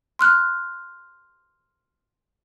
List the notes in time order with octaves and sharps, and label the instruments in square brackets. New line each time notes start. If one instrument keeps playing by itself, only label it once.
[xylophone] C6 F6 F#6